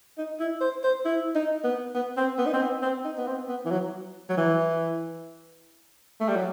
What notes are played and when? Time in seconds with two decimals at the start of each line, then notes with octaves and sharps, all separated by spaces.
0.18 D#4
0.39 E4
0.61 C5
0.84 C5
1.05 E4
1.35 D#4
1.64 B3
1.94 B3
2.17 C4
2.38 B3
2.46 D#4
2.53 C4
2.61 B3
2.82 C4
3.05 D#4
3.17 B3
3.27 C4
3.49 B3
3.65 E3
3.71 F#3
4.29 F#3
4.37 E3
6.20 A3
6.28 G3
6.36 F#3